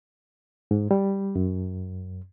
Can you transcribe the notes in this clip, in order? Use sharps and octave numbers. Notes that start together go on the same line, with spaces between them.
G#2
G3
F#2